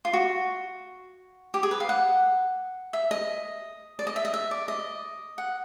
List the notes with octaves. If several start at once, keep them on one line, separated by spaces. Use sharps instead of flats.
F4
F#4
G4
G#4
B4
F5
F#5
E5
D#5
D5
D#5
E5
D#5
E5
D5
D#5
F#5